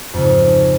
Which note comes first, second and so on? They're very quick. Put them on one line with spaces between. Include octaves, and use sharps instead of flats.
F2 C#3 G#2